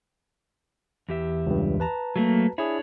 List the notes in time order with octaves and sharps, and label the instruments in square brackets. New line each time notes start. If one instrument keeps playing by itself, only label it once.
[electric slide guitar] E2 G4 E5
[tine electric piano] C#2 G2
B4 A5 A#5
[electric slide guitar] F#3 A3 A#3
[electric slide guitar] D4 C#5 [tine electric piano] E4 G#4